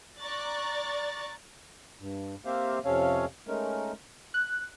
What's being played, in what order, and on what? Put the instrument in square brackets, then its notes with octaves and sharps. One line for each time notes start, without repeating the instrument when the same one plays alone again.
[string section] D5 A#5 C#6 F#6 A6
[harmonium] G2
A#3 C4 G4 C5 E5 F5
F2 C3 C#4 A4 C#5 F5
G#3 A3 C#4 D#4 A#4
[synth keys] F#6